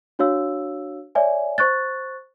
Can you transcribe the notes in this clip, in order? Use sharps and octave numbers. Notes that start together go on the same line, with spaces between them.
D4 F#4 C#5 F5 E6
C#5 D5 E5 G#5
C5 C#6 F#6 A6